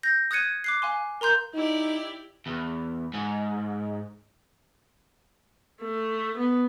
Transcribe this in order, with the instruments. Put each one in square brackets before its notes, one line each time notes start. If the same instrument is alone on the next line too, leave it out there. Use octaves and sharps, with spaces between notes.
[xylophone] G6 A#6
D#6 F#6 G#6 C#7 D#7
D6 F#6 C7
F5 G#5 C6
A#4 A#5 C6 G6
[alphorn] D#4 [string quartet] E4 G4 D5
[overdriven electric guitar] E2
G#2
[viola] A3
B3